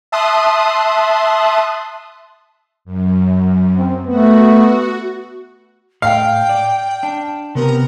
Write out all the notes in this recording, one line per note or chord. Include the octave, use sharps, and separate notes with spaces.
E5 A5 C6 D#6 F#6
F#2
C4
A3 B3 F#4
A2 F5 G5
D5
D4
C3 B3 G4 A#4